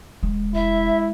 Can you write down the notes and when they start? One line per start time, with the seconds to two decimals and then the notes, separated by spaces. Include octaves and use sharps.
0.23 E1 G#3
0.55 F1 E4 E5